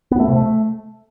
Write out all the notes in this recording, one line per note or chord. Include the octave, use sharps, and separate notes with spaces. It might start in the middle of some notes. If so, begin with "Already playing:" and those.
B3
A3
C3
A3